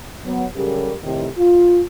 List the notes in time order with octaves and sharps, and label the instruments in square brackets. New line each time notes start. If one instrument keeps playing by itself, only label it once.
[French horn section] F#3 B3
C#3 F#3 G3 G4 A4 A#4
A2 C3 D#3
F4